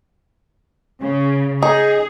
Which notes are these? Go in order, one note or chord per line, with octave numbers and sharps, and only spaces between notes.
C#3
D#4 G#4